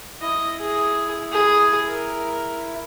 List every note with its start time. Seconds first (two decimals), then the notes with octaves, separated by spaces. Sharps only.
0.21 E4 D#5
0.60 G#4
1.32 G#4
1.87 A#4